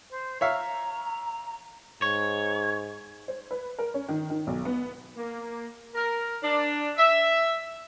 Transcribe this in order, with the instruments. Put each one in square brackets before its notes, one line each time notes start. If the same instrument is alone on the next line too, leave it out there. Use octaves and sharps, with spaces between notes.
[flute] C5
[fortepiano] C#5 E5 F5 [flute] A#5
[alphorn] G#2 [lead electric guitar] C#5
[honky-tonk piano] C5
B4
A#4
C#4
D#3
D#3
B1
B3
[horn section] A#3
A#4
D4
E5